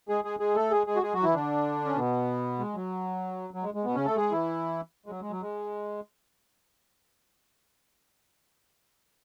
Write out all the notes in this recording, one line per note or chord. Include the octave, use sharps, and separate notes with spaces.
G#3 G#4
G#3 G#4
G#3 G#4
A3 A4
G#3 G#4
G#3 G#4
F#4
G#3 G#4
F#3 F#4
E3 E4
D3 D4
C#4
B2 B3
G#3
F#3
F#3
G#3
G#3
B2 B3
C#3 C#4
A3 A4
G#3 G#4
E3 E4
G#3
F#3
G#3
F#3
G#3